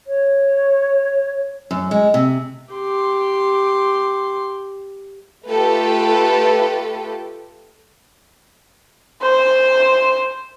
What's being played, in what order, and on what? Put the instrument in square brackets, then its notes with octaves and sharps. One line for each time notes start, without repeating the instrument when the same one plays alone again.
[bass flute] C#5
[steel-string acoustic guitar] F#2
G#3
C3
[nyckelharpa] G4 C6
[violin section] A3 F4 G4 A4 B4
[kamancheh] C5